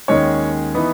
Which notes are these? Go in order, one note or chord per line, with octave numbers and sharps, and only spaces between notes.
D#2 D#3 G#3 C#4 C#5
E3 B3 D#4